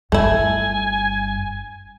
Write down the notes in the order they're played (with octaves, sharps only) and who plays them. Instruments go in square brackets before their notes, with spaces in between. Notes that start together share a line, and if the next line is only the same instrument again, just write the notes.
[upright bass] G1 G2 [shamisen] A3 E4 [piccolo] G#5